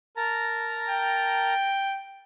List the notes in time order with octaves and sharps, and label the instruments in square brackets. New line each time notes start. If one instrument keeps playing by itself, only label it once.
[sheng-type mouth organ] A#4 A5 A#5
[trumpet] G5